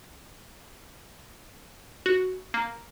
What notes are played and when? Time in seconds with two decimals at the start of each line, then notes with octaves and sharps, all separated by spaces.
2.06 F#4
2.54 A#3